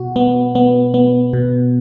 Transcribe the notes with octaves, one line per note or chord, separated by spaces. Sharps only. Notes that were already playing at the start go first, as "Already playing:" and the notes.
Already playing: B2 F#4
B3
B3
B3
B2